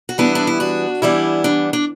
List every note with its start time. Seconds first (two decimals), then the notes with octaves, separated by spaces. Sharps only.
0.09 F#4
0.18 E3 G3 B3 D4 E4
0.35 D4
0.47 E4
0.60 D4 F#4
1.02 E3 G3 B3 D4 E4
1.44 D4
1.73 D4